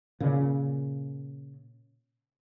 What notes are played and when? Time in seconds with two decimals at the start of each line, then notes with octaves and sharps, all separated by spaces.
0.20 A#2 C#3